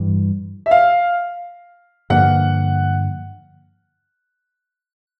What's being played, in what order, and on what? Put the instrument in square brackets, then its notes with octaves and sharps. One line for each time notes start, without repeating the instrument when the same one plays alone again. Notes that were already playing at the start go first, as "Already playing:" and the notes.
Already playing: [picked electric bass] G2 E3 G3
[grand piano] E5
F5
[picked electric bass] G2 D3 F3 A#3 [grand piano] F#5